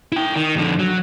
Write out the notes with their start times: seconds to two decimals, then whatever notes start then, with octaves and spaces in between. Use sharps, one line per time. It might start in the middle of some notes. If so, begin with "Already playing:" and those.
0.12 E4 G5
0.35 D#3
0.56 F2 D3
0.79 F#3